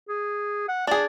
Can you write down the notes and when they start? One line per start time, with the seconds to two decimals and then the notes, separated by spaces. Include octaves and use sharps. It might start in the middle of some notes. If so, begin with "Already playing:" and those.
0.09 G#4
0.68 F#5
0.87 D4 G#4 D5